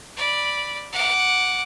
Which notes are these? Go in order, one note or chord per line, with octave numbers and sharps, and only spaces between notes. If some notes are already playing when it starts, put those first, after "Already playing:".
D5 B5
F#5 D6